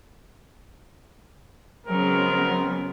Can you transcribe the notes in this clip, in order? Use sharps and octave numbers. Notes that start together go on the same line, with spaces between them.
C#3 F#3 G#3 B3 C4 A#4